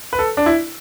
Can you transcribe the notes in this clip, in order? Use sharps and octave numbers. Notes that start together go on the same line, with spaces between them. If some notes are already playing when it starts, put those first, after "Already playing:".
B4
A4
D4
E4